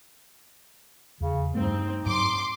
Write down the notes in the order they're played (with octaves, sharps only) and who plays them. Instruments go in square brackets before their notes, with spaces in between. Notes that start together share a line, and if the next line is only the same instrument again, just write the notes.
[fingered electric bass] E2 [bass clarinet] C#3
[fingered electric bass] G2 G3 A3 [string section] C4 [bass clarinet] D#4
[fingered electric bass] G#2 F#3 [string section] C6 D6